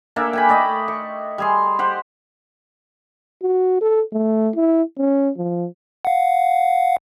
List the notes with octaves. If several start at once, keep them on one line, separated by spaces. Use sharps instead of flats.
A#3 D4 A4 E5
G5 G#5 B5
A3 D5 D#5
C#6
G3 G#4 C6
G4 C5 F#5
F#4
A4
A3
E4
C#4
F3
F5 F#5